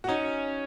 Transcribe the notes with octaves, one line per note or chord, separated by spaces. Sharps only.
F#4
C#4 D#4